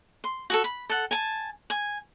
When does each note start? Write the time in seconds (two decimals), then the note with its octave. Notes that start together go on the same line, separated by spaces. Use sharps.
0.24 C6
0.50 F#4 G#4 A4
0.64 B5
0.90 A4 F#5
1.11 G#5 A5
1.70 G#5